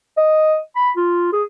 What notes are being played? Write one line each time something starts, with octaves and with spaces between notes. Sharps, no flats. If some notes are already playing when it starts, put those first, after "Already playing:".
D#5
B5
F4
G#4